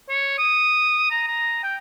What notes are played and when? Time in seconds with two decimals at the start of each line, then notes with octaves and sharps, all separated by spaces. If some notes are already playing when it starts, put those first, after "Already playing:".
0.09 C#5
0.38 D#6
1.11 A#5
1.28 A#5
1.63 G5